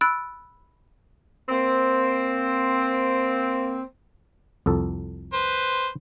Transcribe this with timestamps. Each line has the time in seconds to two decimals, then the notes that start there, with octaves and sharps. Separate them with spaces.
0.01 B5 E6 F#6 A6 D7
1.49 A#3 C4
4.66 C2 F2 A4
5.33 B4 C5